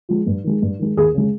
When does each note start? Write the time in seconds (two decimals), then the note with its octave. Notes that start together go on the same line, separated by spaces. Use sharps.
0.09 F3 G#3
0.26 G2
0.44 D#3 G#3
0.62 G2
0.79 D#3 G#3
0.97 D#2 G#4
1.15 C#3 G#3